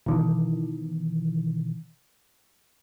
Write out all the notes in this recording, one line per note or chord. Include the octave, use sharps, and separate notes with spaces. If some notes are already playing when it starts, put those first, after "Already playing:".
B2 D#3 E3